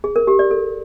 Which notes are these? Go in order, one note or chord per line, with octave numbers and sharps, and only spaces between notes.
G#4
A#4
G4
D5
A4